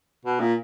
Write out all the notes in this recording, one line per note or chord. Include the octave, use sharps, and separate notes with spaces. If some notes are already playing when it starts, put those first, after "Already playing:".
B2
A#2